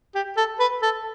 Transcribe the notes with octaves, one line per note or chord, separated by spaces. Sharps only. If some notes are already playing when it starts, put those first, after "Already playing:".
G4
A4
B4
A4